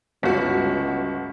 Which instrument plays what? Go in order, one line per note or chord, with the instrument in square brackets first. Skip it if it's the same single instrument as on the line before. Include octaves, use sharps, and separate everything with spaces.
[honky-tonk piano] G1 F#4 [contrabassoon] C#2